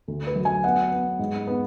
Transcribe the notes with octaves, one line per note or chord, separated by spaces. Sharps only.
D2
B4
F#3
G#5
B3 F#5
B3
G#2
B3